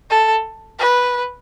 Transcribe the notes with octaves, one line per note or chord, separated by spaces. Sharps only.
A4
B4